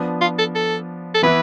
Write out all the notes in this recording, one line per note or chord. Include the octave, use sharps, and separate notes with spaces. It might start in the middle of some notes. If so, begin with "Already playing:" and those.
Already playing: F3 B3 D4
F4
A4
A4
A4
E3 B3 E4 B4